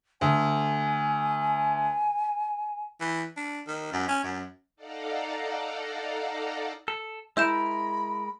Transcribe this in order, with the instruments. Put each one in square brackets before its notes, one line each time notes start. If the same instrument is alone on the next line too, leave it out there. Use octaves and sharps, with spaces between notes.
[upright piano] D2 [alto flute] G#5
[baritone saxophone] E3
D4
D#3
F#2
C#4
F#2
[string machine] D#4 A4 D5 F5 F#5 A#5
[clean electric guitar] A4
[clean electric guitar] G#3 A#4 [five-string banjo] E4 [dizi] B5 [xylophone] E6 G6 E7